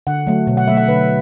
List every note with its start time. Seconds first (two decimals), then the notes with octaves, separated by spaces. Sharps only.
0.07 D3 F#5
0.27 F#3 A3
0.47 B2
0.57 F#5
0.68 F#3 A3 E5
0.77 F#5
0.88 D3 B4